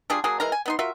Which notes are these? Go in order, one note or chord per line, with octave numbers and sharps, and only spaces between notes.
G3 D4 F4 G#4
F#3 A#3 F#4 G#4
E3 G#3 A#4 A#5
G#5
B3 D#4 C6
F4 F#4 A#4 E5